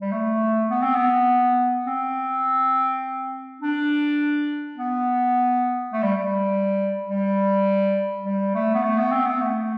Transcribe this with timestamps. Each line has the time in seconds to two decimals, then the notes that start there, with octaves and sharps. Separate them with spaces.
0.01 G3
0.11 A3
0.70 B3
0.83 C4
0.95 B3
1.86 C4
3.61 D4
4.77 B3
5.93 A3
6.03 G3
6.23 G3
7.09 G3
8.25 G3
8.55 A3
8.74 B3
8.83 A3
8.98 B3
9.12 C4
9.26 B3
9.41 A3